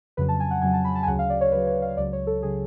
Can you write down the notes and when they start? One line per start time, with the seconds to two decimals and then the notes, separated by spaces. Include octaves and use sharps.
0.17 F2 C#3 F#3 B4
0.28 A5
0.40 G#5
0.51 F#5
0.62 F2 C#3 F#3 G#5
0.74 A5
0.84 B5
0.95 A5
1.03 G#5
1.07 D2 C#3 F#3 F#5
1.19 F5
1.30 D5
1.41 C#5
1.52 D2 C#3 F#3 B4
1.67 C#5
1.82 F5
1.97 C#2 C#3 F#3 D5
2.13 C#5
2.27 A4
2.42 C#3 F#3 G#4